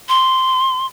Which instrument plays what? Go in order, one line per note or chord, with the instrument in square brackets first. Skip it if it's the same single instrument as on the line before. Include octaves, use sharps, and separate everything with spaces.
[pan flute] C6